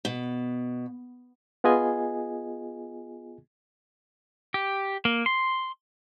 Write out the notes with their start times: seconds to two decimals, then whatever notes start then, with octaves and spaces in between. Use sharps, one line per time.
0.05 B2
1.64 B3 F4 G#4 D#5 G#5
4.54 G4
5.05 A#3
5.26 C6